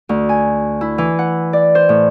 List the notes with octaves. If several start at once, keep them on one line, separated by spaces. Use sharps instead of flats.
D2
G#5
E4
E3
F#5
D5
C5
A2